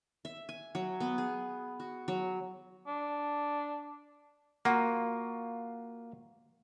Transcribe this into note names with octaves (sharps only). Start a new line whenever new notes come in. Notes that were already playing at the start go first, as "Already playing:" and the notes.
E5
G#5
F#3
B3
G#4
F#4
F#3
D4
A#3 F4 F#4